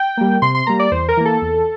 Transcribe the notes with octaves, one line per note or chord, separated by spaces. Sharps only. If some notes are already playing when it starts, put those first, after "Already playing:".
Already playing: G5
G3 A#3
C3 C6
C6
G3 A#3 A#5
D5
E2 C5
A#4
E3 A#3
A4
E2